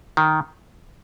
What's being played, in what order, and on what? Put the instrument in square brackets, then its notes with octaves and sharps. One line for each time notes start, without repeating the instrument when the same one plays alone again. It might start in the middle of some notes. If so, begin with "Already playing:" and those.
[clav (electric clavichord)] D#3